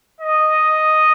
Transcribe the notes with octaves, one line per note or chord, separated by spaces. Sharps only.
D#5